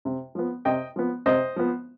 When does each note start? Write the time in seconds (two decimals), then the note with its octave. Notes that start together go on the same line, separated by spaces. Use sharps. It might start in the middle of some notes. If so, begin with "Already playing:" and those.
0.05 C3
0.35 F3 B3
0.65 C3 D#5 G5
0.96 F3 B3
1.26 C3 C5 D#5
1.56 F3 B3